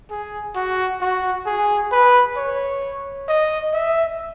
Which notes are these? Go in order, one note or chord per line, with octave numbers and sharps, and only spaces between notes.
G#4
F#4
F#4
G#4
B4
C#5
D#5
E5